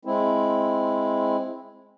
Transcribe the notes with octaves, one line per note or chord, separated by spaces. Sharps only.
G#3 C4 E4